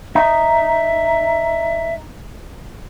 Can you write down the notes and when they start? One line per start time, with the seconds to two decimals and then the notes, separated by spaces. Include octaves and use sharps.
0.15 D#4 E5